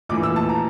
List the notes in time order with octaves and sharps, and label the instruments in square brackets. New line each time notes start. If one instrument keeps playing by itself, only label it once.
[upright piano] A#1 A2 E3 D6
E6
A5
A#5